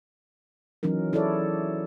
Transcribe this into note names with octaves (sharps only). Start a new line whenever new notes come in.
E3 F#3 C#4 D#4 A#4
E4 G#4 A4 C#5 D5